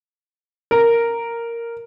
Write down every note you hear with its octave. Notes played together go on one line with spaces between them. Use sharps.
A#4